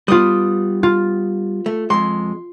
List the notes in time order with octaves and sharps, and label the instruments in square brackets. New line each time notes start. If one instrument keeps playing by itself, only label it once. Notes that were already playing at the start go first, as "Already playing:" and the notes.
[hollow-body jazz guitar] G3 B3 [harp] F4 D#6
[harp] F4
[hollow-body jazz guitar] A3
[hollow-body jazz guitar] F2 G#3 [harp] C6